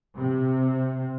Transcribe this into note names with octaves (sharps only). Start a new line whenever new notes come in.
C3